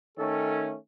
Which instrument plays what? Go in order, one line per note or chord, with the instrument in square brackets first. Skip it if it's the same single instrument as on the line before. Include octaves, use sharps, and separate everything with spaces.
[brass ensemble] D#3 A3 C#4 [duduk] A4